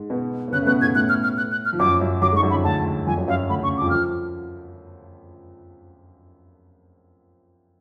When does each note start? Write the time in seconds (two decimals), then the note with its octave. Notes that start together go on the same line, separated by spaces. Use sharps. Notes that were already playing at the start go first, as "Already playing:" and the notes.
Already playing: G#2 G#3
0.10 B2 B3
0.48 B3
0.52 C#3 C#4 F#6
0.62 A3
0.67 B2 B3 F#6
0.81 A2 A3 G#6
0.95 A2 A3 F#6
1.09 F6
1.23 F6
1.37 F#6
1.52 F#6
1.65 F6
1.73 F3
1.79 F#2 F#3 D6
2.01 F#2 F#3
2.22 F#2 F#3 D6
2.32 G#2 G#3
2.36 C#6
2.43 F#2 F#3
2.50 B5
2.53 F2 F3
2.64 D2 D3 A5
2.85 D2 D3
3.06 F2 F3 G#5
3.17 F#2 F#3
3.28 F#2 F#3 F5
3.49 D2 D3 B5
3.59 C#3
3.63 C#6
3.77 F2 F3 D6
3.90 F3 F6